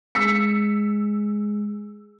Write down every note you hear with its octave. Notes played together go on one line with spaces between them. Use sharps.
G#3 G#4 E6 B6 C#7